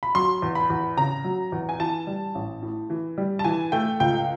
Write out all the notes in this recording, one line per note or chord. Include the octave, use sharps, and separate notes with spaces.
B5
F#3 C6
E2
B5
E2
C#3 A#5
F#3
E2
G#5
E3 A5
G3
A1
A2
E3
G3
A5
E3 G#5
A3 G5
C#2 G5